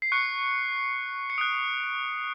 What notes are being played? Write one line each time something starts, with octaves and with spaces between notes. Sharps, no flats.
C7
C#6 F#6 C#7
C#7
D#6 F#6 D7